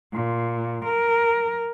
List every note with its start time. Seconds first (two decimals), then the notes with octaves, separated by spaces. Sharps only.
0.13 A#2
0.84 A#4